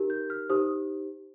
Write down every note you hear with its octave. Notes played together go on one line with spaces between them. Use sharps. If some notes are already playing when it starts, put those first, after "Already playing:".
Already playing: D#4 G4 A#4
G6
F6
D#4 G4 C5 D#6